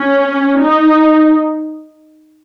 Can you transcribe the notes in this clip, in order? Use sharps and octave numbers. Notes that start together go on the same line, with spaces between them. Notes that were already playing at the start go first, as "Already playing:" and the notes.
Already playing: C#4
D#4